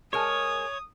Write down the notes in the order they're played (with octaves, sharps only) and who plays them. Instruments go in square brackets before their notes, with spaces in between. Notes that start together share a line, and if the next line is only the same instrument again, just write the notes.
[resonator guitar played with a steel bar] G#3 A#4 G#5 [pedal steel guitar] C#5 [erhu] D#6